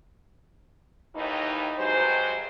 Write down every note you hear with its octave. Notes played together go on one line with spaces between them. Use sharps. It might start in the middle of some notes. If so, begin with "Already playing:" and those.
D#2 A2 E3 D#4
G2 C3 F#3 G#3 C5